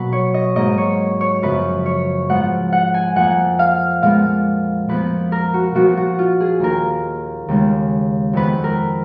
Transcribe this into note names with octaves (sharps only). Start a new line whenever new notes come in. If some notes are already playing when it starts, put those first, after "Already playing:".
Already playing: B2 F#3 A#3 B4
C#5
D#5
G#2 F#3 A#3 D#5
C#5
C#5
F#2 C#3 F3 B3 B4
C#5
G#2 F3 B3 F#5
F#5
G#5
F2 F3 A#3 F#5
F5
A#2 G#3 B3 F5
A#2 F3 B3 B4
A#4
F#4
A#2 F3 B3 F#4
F#4
F4
G#4
D#2 D#3 A#3 A#4
D#2 C#3 G#3 B3
F2 D#3 G#3 B3 B4
A#4